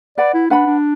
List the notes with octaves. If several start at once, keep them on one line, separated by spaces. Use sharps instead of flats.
B4 D5 F#5 B5
E4
D4 B4 F#5 B5
D4